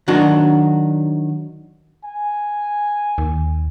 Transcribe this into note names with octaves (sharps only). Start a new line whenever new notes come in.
D#3 F#3 D4 F#4
G#5
D#2